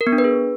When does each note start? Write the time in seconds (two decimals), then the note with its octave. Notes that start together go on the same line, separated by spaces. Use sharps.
0.01 A#4
0.07 B3
0.12 D4
0.18 B4
0.24 G#4